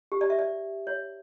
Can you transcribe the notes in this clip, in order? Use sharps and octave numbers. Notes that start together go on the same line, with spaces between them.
G4
D5
E5
D5
C#5